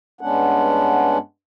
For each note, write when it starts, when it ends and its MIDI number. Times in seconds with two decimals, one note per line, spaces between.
0.21 1.18 43
0.21 1.18 56
0.21 1.18 59
0.21 1.18 61
0.21 1.18 62
0.21 1.18 78